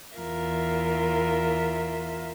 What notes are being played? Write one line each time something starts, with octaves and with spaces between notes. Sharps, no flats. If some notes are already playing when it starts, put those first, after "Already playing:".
E2 F4 A#4 E5